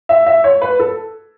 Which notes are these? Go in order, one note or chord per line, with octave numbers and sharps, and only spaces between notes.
E5
E5
C#5
B4
A4